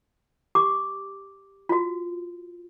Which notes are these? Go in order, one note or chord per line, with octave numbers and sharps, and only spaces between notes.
G4 D6
F4 F#4